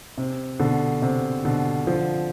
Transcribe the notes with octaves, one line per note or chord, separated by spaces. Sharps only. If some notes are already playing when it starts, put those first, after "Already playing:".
C3
B2 D3
C3
B2 D3
D3 F3